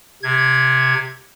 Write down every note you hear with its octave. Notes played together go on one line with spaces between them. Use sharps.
C3 G#6